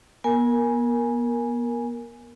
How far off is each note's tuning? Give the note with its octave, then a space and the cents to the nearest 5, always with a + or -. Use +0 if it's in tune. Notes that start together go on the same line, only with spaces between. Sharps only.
B3 -40 A#4 +0 G#5 +0